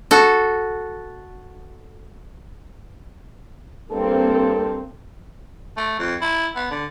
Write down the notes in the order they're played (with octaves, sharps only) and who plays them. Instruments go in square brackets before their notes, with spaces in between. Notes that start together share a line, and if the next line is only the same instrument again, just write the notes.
[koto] F#4 A4
[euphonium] G2 [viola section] A#3 C4 [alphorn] A4
[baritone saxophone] A3
F2
E4
B3
D3